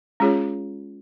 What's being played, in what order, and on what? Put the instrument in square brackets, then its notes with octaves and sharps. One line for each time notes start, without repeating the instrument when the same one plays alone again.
[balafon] G#3 C#4 F4 G#4 C#5